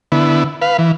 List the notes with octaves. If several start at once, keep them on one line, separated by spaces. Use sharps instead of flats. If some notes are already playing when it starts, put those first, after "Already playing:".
D3 B3 E4
B4 F5
E3